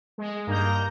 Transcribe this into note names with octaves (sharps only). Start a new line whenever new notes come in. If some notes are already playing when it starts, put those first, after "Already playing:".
G#3
G2 A#3 D#4 A#5 G6